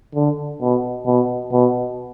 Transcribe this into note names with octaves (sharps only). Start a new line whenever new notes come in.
D3
B2
B2
B2